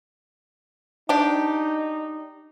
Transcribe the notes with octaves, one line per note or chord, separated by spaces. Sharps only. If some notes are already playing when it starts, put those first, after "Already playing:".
D4 D#4 G4